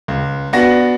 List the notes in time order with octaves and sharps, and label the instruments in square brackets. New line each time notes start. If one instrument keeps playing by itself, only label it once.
[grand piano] C#2
B3 D4 F#4 A#6